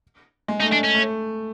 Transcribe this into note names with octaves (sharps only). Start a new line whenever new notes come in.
G#3
A3 D#4
G#3 D4
C#4
A3